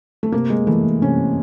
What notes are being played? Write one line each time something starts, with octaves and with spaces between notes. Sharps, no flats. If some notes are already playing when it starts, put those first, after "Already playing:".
A3
C3 A#3
G#3
E3 A3
C3 C#4